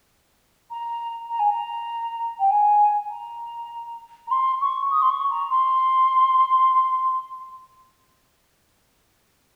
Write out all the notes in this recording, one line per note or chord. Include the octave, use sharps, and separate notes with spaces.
A#5
A#5
G#5
A#5
G5
G#5
A#5
A#5
C6
C#6
D#6
C6
C#6
A#5
C6